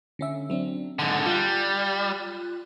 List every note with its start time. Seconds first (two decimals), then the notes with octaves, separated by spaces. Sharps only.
0.19 D3 C#4 E5
0.50 F#3 C4 D4
0.99 G#2 D3 F#5
1.26 G3 F4 F#6